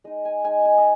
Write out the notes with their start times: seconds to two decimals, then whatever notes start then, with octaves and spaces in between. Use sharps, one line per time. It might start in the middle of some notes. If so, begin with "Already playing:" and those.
0.04 G#3 D#4 D#5
0.25 G#5
0.44 G#3 D#4 G#5
0.65 G#5
0.78 D#5